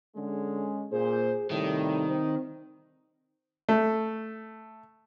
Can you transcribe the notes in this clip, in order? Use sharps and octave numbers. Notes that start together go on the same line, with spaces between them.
D3 G#3 C#4
A#2 G#4 C5
A2 C3 D#3 G3
C4
A3